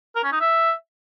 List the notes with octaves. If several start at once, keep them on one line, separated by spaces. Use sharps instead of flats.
A#4
C#4
D#4
E5